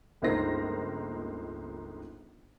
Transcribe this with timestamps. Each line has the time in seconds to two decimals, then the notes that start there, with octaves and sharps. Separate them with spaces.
0.22 G1 C#2 A#3 D#4 C5 A#6